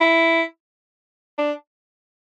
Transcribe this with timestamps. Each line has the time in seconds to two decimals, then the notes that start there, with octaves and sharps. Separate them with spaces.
0.01 E4
1.38 D4